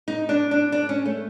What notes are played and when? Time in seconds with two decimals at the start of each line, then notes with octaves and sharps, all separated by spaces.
0.08 D#4
0.29 D4
0.51 D4
0.72 D4
0.89 C#4
1.06 A3